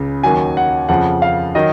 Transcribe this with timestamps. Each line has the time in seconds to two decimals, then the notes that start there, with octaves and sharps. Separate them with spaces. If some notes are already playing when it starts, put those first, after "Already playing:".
Already playing: C#2 C#3
0.23 D#2 D#3 F#3 G#5
0.57 F#5
0.89 F2 C#3 F3 F#5
1.22 F5
1.55 D#3 F#3 D#5